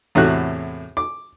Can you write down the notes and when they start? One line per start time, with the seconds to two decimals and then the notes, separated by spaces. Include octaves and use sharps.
0.15 E2 A2 C3 F#4 F#6
0.97 D6